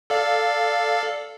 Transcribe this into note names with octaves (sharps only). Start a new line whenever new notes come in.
A4 D5 F5